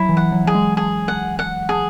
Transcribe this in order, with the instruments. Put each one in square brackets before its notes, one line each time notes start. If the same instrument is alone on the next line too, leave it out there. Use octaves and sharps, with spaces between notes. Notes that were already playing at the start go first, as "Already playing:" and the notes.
Already playing: [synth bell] F#3 [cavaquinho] E4
[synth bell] E3
[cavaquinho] F#5
[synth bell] F#3
[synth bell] F#3 [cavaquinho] G#4
[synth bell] G#3
[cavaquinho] G#4
F#5
F#5
G#4